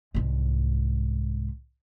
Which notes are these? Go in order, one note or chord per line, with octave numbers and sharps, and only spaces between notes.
C2 G#2